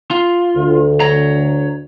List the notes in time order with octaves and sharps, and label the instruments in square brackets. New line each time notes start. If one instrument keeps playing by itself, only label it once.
[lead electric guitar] F4
[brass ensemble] D2
[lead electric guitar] C#5 A#5